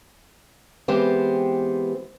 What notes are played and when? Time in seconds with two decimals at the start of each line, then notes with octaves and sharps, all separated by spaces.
0.88 E3 G#3 B3 C4 G4 C5